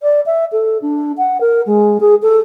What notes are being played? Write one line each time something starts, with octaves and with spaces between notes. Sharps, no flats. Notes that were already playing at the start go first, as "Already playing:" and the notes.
D5
E5
A4
D4
F#5
A#4
G#3
G#4
A4